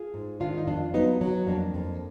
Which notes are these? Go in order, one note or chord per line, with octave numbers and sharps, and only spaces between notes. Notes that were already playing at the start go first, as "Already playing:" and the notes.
Already playing: F4 G#4
G#2
D#3 D4 F4
D#4
F2 D4 F4
F#3 B3 D#4
F#3
F2 A#3 D4
F2